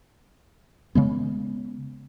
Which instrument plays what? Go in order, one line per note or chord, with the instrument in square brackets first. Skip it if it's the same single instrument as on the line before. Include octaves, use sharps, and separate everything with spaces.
[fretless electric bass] C#3 G#3 B3